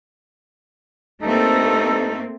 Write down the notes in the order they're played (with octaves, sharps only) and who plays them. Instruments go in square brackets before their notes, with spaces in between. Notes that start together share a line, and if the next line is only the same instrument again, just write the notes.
[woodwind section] G2 D#4 A4 [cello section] A3 A#3 C4